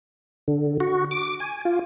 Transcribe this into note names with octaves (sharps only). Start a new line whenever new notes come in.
D3
F#4
D6
G#5
F4